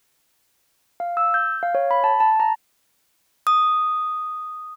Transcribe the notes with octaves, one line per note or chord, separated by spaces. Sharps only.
F5
E6
G6
F5
C#5
B5
A5
A5
A#5
D#6